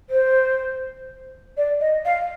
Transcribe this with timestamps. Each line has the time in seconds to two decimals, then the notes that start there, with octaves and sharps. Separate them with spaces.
0.10 C5
1.57 D5
1.80 D#5
2.05 F5